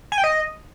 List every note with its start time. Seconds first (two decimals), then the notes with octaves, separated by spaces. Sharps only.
0.12 G#5
0.18 G5
0.24 D#5